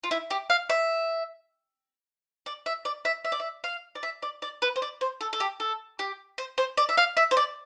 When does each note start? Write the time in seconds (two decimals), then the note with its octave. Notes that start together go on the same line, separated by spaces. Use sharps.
0.04 F4
0.11 E4
0.30 G4
0.50 F5
0.70 E5
2.46 D5
2.66 E5
2.85 D5
3.05 E5
3.25 E5
3.32 D5
3.40 E5
3.64 F5
3.95 D5
4.03 E5
4.22 D5
4.42 D5
4.62 B4
4.76 C5
4.82 D5
5.01 C5
5.21 A4
5.33 A4
5.40 G4
5.60 A4
5.99 G4
6.38 C5
6.58 C5
6.78 D5
6.89 E5
6.97 F5
7.17 E5
7.31 C5
7.37 D5